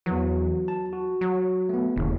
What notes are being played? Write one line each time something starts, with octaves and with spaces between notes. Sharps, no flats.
E2 E3 F#3
A5
F#4
F#3
A3 B3
E1 D#2 A2 C#3